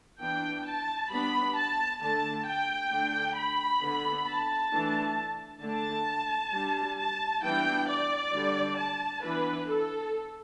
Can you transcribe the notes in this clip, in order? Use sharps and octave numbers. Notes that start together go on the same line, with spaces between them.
E3 B3 D4 G5
A5
G3 B3 D4 B5
A5
D3 A3 D4 A5
G5
D3 A3 D4
B5
D3 B3 D4
A5
E3 A3 D4
D3 A3 D4 A5
G3 D4
A5
E3 G3 B3 D4 G5
D5
D3 G3 D4
A5
E3 B3 D4 B4
A4